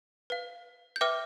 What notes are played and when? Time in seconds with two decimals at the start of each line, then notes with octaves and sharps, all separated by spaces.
0.30 B4 F5
0.96 G6
1.01 B4 E5 G5 D6 F6